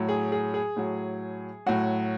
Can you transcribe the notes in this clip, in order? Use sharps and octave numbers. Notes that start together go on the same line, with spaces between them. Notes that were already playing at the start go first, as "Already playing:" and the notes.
Already playing: A2 F#3
G#4
G#4
G#4
A2 F#3
A2 F#3 F#4